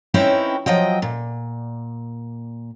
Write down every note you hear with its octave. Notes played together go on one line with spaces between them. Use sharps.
C4 C#4 D#4 E4 B4 G5
F3 F#3 D#5 G5
A#2